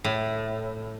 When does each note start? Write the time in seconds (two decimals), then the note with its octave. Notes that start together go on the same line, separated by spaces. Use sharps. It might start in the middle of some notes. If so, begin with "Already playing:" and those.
0.04 A2